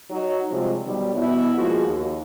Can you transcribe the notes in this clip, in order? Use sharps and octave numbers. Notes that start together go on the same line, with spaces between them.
F#3 D#4
C3 F3 G3 G#3
B2 D#3 F#3 G3
B2 B3 E4
F3 G#3 A#3 F4 F#4 G#4
D#2